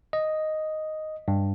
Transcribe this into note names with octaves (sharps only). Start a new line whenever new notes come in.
D#5
G2